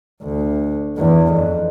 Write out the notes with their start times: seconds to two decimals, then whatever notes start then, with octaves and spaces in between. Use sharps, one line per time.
0.23 D2
0.97 E2
1.32 F2